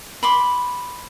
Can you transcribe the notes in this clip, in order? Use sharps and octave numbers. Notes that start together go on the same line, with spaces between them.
B5 C6 D6